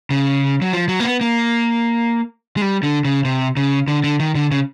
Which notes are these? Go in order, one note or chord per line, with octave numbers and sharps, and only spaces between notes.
C#3
F#3
F3
F#3
A#3
B3
A#3
G#3
G3
D3
C#3
C3
C#3
D3
D3
D#3
D3
C#3